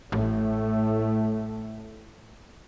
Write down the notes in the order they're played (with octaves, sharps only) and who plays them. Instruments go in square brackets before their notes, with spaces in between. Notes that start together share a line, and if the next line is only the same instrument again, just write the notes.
[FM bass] A1 [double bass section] A2 A3